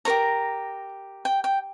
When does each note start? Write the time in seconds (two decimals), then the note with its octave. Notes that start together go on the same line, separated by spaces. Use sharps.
0.05 G4 A#4 C#5 A#5
1.25 G5
1.44 G5